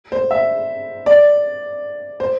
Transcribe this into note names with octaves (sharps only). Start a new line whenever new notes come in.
C5
E5
D5
C5